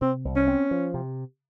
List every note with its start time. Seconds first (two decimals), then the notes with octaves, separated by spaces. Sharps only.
0.01 C3 C4
0.25 C2
0.36 C#4
0.48 C4
0.71 F3
0.94 C3